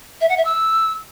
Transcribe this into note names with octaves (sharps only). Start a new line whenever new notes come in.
E5
F#5
E5
E6